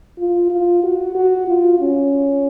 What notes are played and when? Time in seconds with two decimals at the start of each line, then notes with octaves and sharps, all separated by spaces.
0.18 F4
0.50 F4
0.83 F#4
1.15 F#4
1.48 F4
1.79 C#4